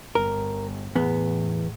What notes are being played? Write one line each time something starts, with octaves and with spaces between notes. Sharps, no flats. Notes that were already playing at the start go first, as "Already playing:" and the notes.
G1 A#4
E2 A2 B3